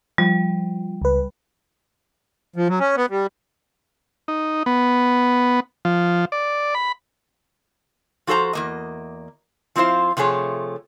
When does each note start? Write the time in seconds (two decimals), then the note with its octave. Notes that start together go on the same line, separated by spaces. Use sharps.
0.18 F3 G3
1.02 C#2 B4
2.56 F3
2.68 F#3
2.80 C#4
2.96 B3
3.10 G3
4.28 D#4
4.66 B3
5.85 F3
6.32 D5
6.75 B5
8.27 F3 F#4 A4 C5 A#5
8.53 E2 A#3 D#5
9.76 F3 C4 E4 F4 C5
10.17 C3 F3 A3 G#4 C#5